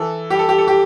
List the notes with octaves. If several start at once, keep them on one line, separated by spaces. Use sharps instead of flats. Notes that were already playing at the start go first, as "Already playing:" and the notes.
Already playing: E3 A4
G3 G4
A4
G4
A4
G4